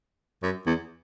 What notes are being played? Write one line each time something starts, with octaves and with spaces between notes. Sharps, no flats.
F#2
E2